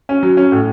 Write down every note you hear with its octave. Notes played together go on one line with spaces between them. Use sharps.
C#4
F#3
C#4
A2